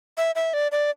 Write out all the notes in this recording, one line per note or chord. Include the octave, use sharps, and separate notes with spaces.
E5
E5
D5
D5